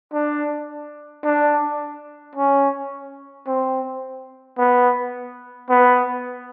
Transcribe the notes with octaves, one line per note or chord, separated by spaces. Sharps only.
D4
D4
C#4
C4
B3
B3